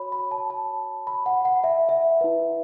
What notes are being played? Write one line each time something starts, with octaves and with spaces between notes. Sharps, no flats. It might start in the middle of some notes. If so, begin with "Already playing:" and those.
Already playing: F#4 C#5 B5
B5
A5
A5
B5
F#5
F#5
E5
E5
E4 B4